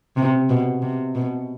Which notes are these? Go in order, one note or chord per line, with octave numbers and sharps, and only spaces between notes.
C3
B2
C3
B2